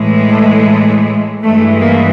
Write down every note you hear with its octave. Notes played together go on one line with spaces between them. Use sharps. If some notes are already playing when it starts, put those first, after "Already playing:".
Already playing: A2 E3 G#3
A3
A3
G2 E3 G#3 A3
A#3